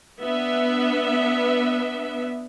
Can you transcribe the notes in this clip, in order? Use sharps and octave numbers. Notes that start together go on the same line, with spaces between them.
B3 D4 E5